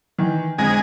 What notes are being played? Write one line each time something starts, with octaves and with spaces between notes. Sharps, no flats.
D#3 E3
F2 D3 G#3 G#5 A#6